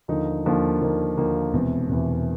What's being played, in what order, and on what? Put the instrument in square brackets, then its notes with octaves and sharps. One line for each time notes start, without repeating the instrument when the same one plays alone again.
[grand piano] D#2 D3 F3 A#3 D#4
D#2 D3 F3 A#3 D#4
D#2 D3 F3 A#3 D#4
D#2 D3 F3 A#3 D#4
E1 E2 C3 E3
E1 E2 C3 E3